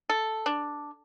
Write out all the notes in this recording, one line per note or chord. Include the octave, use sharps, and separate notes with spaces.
A4
D4